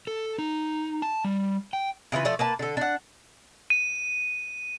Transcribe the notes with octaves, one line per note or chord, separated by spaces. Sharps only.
A4
D#4
A5
G3
G5
C#3 E3 F4 B4
F3 A3 D5
A#3 B4 A5
D3 A4
D4 F#5
D#7